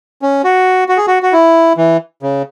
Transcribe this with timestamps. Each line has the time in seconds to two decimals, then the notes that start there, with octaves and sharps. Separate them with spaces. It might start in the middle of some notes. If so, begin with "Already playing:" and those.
0.22 C#4
0.44 F#4
0.89 F#4
0.97 G#4
1.07 F#4
1.23 F#4
1.33 E4
1.77 E3
2.23 C#3